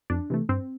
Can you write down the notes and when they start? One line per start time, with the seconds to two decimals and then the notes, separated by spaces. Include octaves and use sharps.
0.10 F2 D4
0.30 C3 E3 A3
0.49 G2 C4